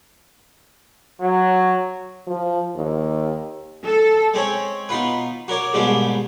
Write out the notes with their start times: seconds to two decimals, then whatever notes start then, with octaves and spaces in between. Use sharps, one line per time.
1.21 F#3
2.27 F3
2.75 D#2
3.85 A4
4.34 G#3 C4 C#4 C#5
4.89 B2 D#4 F4 B4
5.48 F#4 A#4 C#5 D5
5.74 D#2 G#2 B2 G3 G#3 D4